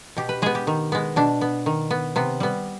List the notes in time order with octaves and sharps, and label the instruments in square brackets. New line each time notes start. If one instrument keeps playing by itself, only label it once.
[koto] B2 G4
B4
G#3 B3 G#4
G4
D#3
G#3 B3
B2 D4
B3
D#3
B3
C3 B3
G3 B3